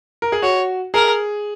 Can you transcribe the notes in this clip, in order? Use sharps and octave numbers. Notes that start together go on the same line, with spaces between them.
A#4
G#4
F#4 C#5
G#4 A#4